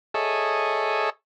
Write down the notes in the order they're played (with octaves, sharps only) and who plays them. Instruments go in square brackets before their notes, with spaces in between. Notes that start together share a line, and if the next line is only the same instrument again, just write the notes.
[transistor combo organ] G#4 A4 C#5 D#5 E5